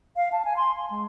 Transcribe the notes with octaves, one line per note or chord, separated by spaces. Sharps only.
F5
A5
G#5
C6
C6
G#3